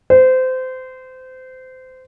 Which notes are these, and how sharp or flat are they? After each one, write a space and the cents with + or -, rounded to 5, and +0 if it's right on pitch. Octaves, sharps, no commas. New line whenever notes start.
C5 -25